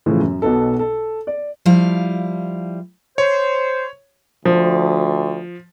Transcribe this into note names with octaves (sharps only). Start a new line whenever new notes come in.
A2 C#3 E3 F3
F#2
B1 B2 B3 A4
A4
D5
F3 G3 E4 F5
C5 C#5
D2 F3